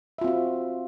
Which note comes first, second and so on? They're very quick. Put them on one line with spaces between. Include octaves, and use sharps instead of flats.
E5 F4 C4 F#4